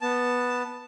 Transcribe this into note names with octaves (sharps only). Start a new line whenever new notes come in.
B3 A5